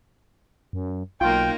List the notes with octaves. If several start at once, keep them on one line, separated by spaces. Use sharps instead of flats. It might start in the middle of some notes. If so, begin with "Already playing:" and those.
F#2
B1 A#3 D#4 F4 G5